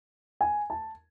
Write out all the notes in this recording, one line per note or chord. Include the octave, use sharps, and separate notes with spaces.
G#5
A5